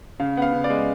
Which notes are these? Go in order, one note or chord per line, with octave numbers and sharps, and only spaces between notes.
C#3 F5
B3 F5 F#5
C#3
D5
G#3